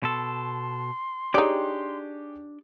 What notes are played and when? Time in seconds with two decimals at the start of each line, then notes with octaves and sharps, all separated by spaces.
0.03 B2 A4 C6
1.34 D4 D#4 G4 G#4 C#5 D5 G5